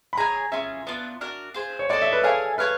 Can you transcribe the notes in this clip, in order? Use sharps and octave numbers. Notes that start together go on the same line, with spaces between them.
B5
G#4 C#5 E5 G#5 A#5
C#4 F4 G#4 E5
B3 D4 F4
D4 F#4 A#4
F4 G#4 C5
C#5
D#4 F#4 A4 D5
E5
B4
E4 G#4 A4 C#5 F5
G#4 B4 C#5 F5